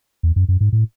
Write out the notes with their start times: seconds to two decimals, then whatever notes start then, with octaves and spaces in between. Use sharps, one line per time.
0.23 E2
0.36 F#2
0.48 F#2
0.61 G#2
0.73 A2